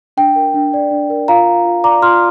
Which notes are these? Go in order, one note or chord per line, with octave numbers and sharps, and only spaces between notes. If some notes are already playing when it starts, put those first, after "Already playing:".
D4 G5
A#4
D4
D5
D4
A#4
F4 F5 A#5
A#4
F4
D5 A#5 D6
F4 C6 F6